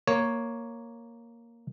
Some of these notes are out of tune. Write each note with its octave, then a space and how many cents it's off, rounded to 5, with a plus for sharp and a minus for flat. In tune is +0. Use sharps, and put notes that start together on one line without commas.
A#3 +0 C#5 +0